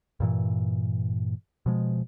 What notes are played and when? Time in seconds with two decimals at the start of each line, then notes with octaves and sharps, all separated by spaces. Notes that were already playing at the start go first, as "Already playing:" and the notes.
0.20 G2 A#2 E3
1.66 B2 F3 G#3